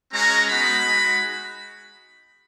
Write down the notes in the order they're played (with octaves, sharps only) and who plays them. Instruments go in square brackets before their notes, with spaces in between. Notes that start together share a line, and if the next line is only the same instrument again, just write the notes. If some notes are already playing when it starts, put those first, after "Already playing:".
[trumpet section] G#3 C#4 F#4 A#5
G#3 B3 D#4 F#4 B5
G#3 D#4 F#4